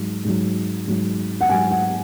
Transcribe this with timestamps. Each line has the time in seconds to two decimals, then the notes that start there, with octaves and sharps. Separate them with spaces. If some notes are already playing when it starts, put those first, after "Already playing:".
Already playing: G#2 F#3
0.25 G#2 F#3
0.87 G#2 F#3
1.41 F#5
1.49 G#2 F#3 G#5
1.71 F#5